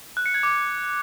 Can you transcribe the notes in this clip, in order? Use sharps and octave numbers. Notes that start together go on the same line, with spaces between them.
F#6
C#7
G#6
D6